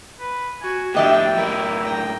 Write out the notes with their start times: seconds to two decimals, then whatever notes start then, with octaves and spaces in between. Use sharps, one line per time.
0.20 B4
0.62 F#4 G#5
0.94 A2 F3 D4 G4 D#5 E5 G5
1.35 F#2 A2 E4 A#4
1.83 G5 A#5